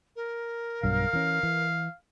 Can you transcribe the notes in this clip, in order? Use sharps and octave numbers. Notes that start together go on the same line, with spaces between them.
A#4
B1 G2 F#3 F5
E3 C#4
E3